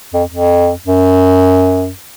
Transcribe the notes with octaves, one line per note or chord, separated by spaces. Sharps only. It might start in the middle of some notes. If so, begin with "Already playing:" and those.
F2
F2
F#2